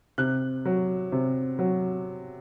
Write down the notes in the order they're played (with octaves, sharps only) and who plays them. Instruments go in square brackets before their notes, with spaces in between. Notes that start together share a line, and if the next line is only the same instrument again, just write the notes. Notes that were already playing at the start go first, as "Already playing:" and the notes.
[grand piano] C3 F#6
F#3
C3
F#3